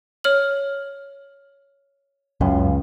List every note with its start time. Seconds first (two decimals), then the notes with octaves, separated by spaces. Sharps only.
0.24 C#5 F6 F#7
2.41 C#2 F#2 C#3